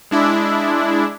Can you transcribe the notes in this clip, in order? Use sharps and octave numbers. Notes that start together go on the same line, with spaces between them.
G#3 D4 E4